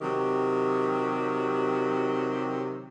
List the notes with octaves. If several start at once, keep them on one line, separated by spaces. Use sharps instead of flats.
C3 D#3 F#3 G4